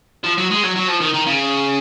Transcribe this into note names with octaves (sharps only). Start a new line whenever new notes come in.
F3
F#3
G#3
F#3
F#3
F3
D#3
D#3
C#3